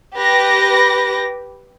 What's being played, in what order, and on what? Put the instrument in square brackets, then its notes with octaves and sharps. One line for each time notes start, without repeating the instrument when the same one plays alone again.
[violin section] G4 B4 A#6